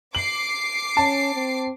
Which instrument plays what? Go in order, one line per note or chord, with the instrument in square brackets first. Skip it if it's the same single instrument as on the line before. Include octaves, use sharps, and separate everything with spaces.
[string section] D6 C7 [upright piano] F#7
[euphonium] C#4 [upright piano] A5
[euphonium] C4